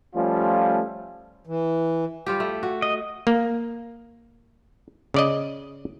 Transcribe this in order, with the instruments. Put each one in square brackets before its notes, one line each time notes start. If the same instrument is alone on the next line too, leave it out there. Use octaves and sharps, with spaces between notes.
[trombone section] F3 G3 A3 C#4 F4
[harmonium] E3
[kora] G3 F4 G4
A3
F#4
[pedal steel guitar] D#5
[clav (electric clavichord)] A#3
C#3 D5 D#5